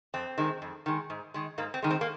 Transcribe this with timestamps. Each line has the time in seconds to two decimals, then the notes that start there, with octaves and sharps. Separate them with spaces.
0.14 F2 C4
0.38 D#3 G#3
0.62 F2
0.86 D#3 G#3
1.10 G#2
1.34 D#3 G#3
1.58 G#2 A#3
1.74 C4
1.82 D#3 G#3
1.90 C4
2.01 A#3